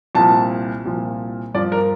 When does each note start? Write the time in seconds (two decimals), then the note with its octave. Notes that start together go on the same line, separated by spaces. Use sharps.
0.15 C2 A#2 F3 A5
0.85 C2 A#2 F3
1.54 G2 F3 D5
1.72 A#4